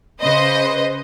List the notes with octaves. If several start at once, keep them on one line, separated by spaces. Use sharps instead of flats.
C#3 B4 C5 D#5